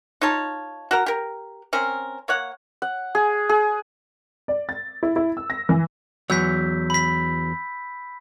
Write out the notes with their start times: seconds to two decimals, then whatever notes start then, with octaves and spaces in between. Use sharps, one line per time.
0.21 D#4 F4 C#5 A5
0.91 F#4 A#4 A#5
1.06 G4 A#4
1.73 C4 C#4 A#4
2.28 A#3 C#5 F#5
2.82 F#5
3.15 G#4
3.49 G#4
4.48 D5
4.69 A6
5.03 E4
5.16 E4
5.37 E6
5.50 A#6
5.69 E3
6.30 E2 F#3 E6 G6 B6
6.90 B5 B6